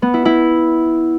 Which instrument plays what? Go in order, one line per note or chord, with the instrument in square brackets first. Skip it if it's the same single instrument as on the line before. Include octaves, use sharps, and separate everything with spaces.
[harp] B3
E4
E4